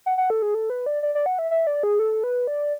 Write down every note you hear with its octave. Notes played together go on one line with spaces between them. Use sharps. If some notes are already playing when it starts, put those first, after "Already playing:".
F#5
F#5
A4
G#4
A4
B4
D5
D5
D5
F#5
E5
E5
D5
G#4
A4
B4
D5